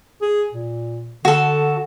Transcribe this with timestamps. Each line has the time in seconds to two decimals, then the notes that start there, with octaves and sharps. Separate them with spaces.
0.22 G#4
0.54 A#2
1.25 D3 F#4 A4